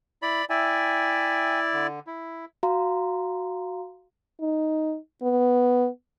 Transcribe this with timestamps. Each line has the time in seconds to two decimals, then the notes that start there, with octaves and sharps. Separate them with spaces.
0.22 E4 D5 B5
0.50 E4 D5 E5 G5 G#5
1.73 D3
2.07 E4
2.63 F#4 F5 A#5 C6
4.41 D#4
5.23 B3